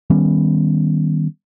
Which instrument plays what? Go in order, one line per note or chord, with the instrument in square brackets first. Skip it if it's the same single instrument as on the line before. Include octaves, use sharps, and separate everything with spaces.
[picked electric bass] D#3 G3 B3 C#4